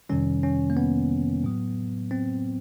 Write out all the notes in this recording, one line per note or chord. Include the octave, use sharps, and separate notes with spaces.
F2 C3 D#3 G3 C#4
C#4
A#3
B3
A2 F#3
C4